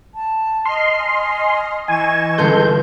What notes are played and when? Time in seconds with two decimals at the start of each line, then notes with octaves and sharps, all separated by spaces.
0.15 A5
0.66 D#5 C6 F6
0.99 G#5
1.88 E3 D#5 G#5 C#6 E7
2.38 G1 E3 G#3 C#4 A4 C6 G6